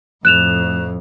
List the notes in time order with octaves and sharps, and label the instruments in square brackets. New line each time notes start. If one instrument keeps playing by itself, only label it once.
[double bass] F2 A2 [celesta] F#6 E7 F7